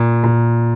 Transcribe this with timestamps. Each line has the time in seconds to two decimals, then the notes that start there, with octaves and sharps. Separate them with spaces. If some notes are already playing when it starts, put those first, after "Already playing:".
Already playing: A#2
0.24 A#2